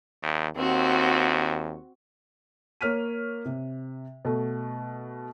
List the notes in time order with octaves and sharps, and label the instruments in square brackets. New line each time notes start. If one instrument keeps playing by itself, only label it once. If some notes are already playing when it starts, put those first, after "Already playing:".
[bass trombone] D#2
[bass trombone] D#2 [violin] C4 F#4
[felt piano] A#3 C#5 F6 B6 D#7
C3
B2 A3